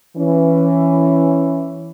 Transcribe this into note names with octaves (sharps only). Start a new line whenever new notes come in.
E3 C#4